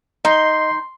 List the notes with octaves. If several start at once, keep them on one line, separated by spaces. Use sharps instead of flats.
D#4 D#5 C6